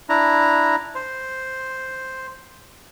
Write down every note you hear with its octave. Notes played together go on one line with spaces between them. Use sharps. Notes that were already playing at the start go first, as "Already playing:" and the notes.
D4 E4 A#5
C5